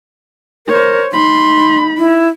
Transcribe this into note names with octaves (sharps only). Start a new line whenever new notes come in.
A#4 C5 C#5
D#4 B5 C6
E4